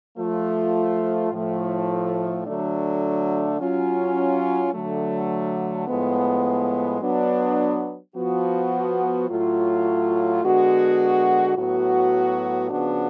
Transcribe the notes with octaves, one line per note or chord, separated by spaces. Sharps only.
F3 A3 F4
A2 F3 A3
D3 F#3 A3 D4
F#3 C#4 F4
D3 F#3 A3
A2 F3 G#3 B3
F#3 B3 D4
F3 B3 F#4
A2 F#3 A3 F4
D3 G#3 B3 F#4
A2 F#3 B3 F#4
C#3 F3 B3 D4 F#4